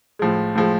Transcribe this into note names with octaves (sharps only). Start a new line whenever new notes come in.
A2 F3 G#3
A2 F3 G#3